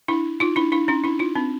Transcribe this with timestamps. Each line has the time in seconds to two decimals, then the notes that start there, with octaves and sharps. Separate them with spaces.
0.08 D4 E4
0.40 D#4 F4
0.56 D4 E4
0.72 D4 E4
0.88 C#4 D#4
1.04 D4 E4
1.19 D#4 F4
1.35 C4 D4